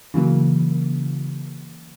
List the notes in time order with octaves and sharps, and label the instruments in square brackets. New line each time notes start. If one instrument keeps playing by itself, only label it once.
[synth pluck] C#3 E3 F#3 A#3